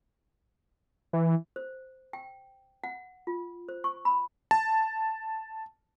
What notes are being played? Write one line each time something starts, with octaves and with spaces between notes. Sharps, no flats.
E3
C5
G5
F#5
F4
C5
C#6
B5
A5